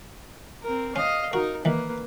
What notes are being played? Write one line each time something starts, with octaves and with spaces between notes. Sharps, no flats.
C4 A#4
C#4 D#5 F5
D#4 F#4 A#4
D#3 E3 A#3 B4